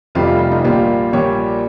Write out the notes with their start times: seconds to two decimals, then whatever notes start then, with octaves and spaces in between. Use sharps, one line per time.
0.15 F1 F2 C3 G3 F4
0.39 F4
0.51 D#4
0.64 A#1 A#2 G3 F4
1.12 A#1 A#2 G3 C#5